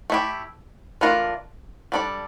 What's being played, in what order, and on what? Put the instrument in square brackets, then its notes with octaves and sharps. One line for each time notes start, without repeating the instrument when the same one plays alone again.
[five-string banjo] A3 E4 G4
E3 A3 D4 F4 A#4
G3 D4 A4 D5